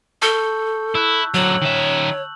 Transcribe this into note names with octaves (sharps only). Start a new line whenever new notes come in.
A4 A5 C#6 G6
E4 E6 F#6
D3 F#3 C#5 E6 F#7
D#3 E5